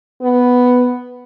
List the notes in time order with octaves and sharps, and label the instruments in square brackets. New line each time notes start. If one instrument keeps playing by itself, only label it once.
[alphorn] B3